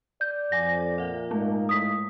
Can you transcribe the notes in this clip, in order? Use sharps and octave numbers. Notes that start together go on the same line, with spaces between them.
D5 G6
F2 F#5 G#5 D6 A#6
A#2 E5 F#5
G#2 G#3 A3 D#4 F5
A2 D#6 B6